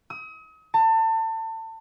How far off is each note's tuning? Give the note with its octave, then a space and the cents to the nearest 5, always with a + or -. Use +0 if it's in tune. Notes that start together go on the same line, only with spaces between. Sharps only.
D#6 +40
A5 +30